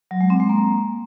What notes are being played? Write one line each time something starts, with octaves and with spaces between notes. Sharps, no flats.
F#3
G#3
C4
G#3
A#3